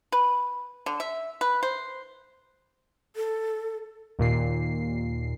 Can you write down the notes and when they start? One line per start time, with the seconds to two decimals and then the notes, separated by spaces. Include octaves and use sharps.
0.12 B4
0.86 D3
1.00 E5
1.41 B4
1.63 C5
3.16 A4
4.19 D#2 A#2 C7